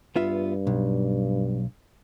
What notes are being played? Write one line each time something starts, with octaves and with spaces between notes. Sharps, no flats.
G2 B3 F4 E5
B1